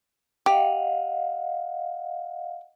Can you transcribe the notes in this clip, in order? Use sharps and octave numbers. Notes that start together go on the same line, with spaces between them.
G4 D#5 F5 F#5